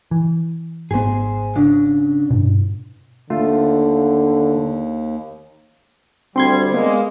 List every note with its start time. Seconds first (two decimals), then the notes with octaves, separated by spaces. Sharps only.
0.11 E3
0.91 G#1 B3 G#4 C5
1.56 C#3 D4
2.30 G2 B2
3.30 D#2 D3 A3 F4
6.36 D2 G3 C4 C6 G#6
6.73 G#3 A#3 B3